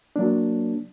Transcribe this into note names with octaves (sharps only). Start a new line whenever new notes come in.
F#3 A#3 D4